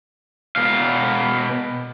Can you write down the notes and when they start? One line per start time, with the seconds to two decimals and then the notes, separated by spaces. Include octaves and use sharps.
0.56 B2 F5